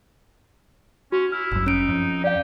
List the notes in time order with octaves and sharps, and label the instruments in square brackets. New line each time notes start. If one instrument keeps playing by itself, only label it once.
[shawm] C#4 [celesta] F#4
[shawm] E4 [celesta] F6
[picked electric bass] G1 F#2 [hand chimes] E6
[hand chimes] C#4 D7 [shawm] D#4
[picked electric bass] F2
[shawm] G4 [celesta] D5 F5